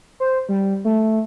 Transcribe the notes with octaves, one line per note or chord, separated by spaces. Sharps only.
C5
G3
A3